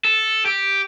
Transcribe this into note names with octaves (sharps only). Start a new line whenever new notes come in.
A4
G4